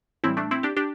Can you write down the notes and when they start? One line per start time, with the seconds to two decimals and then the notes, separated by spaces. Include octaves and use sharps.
0.24 A2 E3 G3 C4 E4
0.37 A3 D4
0.51 C4 E4
0.63 D4 G4
0.77 D4 G4